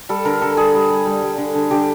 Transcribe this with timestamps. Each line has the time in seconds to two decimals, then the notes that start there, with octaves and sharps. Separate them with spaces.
0.09 G3 A4
0.25 D3 A#4
0.42 D3 A4
0.57 G3 G#4
0.74 G3
0.90 G3
1.06 G3
1.22 G3
1.38 D3
1.55 D3
1.71 D3 G4